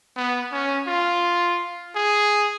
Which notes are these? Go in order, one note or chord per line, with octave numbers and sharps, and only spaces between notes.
B3
C#4
F4
G#4